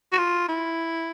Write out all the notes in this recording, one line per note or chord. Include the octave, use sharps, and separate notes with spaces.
F#4
F4
E4